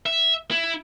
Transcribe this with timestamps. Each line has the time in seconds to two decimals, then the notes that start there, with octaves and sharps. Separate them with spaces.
0.06 E5
0.51 E4